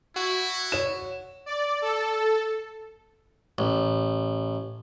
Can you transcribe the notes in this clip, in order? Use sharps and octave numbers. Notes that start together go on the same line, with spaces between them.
E4 F#4
C#5 E7
D5
A4
A1